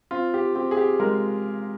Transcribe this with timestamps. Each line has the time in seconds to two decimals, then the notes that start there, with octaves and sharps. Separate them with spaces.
0.11 C4 F4
0.34 G4
0.55 C4 G4
0.71 G#4
0.77 G4
1.00 G#3 A#4